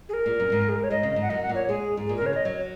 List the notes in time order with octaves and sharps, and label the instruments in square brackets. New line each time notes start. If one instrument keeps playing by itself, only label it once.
[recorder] G#4
A#4
[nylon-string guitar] A#2
F#2
G#2
[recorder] G#4
A#4
C#5
[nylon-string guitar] G#2 [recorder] D#5
[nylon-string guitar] C#3
G#2
[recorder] F#5
[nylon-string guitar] F#2 [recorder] D#5
[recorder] F#5
[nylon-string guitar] A#2
[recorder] C#5
[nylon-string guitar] G#3 [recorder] G#4
[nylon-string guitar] G#2
[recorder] G#4
[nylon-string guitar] A#2
[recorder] A#4
[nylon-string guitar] C#3 [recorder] C#5
[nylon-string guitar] D#3 [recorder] D#5
[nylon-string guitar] F#3 [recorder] C#5